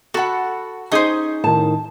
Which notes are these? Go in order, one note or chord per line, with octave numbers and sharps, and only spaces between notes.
F#4 A4 F#5 B5
C#4 D#4 G#4 C5 D#6
A2 D#3 A5